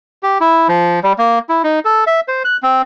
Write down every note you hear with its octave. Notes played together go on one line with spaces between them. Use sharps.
G4
E4
F3
G3
A#3
E4
D#4
A4
E5
C5
F#6
C4